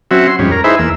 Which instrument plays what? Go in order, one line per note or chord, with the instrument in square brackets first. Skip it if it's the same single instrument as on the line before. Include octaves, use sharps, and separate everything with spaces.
[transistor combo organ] F#3 C4 C#4 F#4 E5
C6
F2 G#2 G3 C#4
A#4
D#4 E4 G#4 B4 C5 E5
E2 A#3 E6